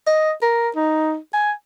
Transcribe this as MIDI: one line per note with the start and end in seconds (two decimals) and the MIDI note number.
0.07 0.32 75
0.42 0.69 70
0.76 1.16 63
1.33 1.52 80